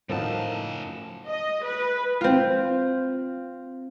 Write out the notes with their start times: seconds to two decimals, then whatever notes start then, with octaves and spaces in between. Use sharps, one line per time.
0.09 F#2 A2 F3 D#4 F#4 A#4 A5 E6
1.26 D#5
1.64 B4
2.21 C4 F4